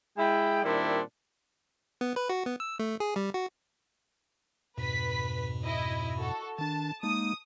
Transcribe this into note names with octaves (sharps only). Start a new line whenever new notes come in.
G#3 E4 G5
A#2 D#3 G3 C4 D4 E4
B3
B4
F#4
B3
E6
A3
G#4
G3
F#4
F2 G#2 B2 B4 B6
E4 D#5
F#4 A4
D#3 D4 A5
G#3 A#3 D#4 D#6